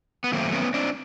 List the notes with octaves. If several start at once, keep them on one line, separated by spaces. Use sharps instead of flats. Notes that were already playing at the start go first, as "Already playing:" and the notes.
B3
F#2 D#3 F#3 A3 A#3 C4
B3 C#4
C4 D4